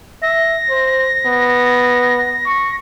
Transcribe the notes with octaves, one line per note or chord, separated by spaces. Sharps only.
E5 A#6
C5
B3
C#6